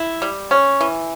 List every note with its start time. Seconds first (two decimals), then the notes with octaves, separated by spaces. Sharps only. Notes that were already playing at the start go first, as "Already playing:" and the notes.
Already playing: E4
0.22 G3
0.51 C#4
0.81 E3